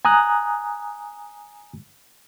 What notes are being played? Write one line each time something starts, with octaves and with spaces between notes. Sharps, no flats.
G#5 A#5 D#6 F#6